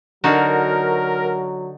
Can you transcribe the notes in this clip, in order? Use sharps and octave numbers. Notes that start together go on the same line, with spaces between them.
D3 F#3 D#4 F#4 A#4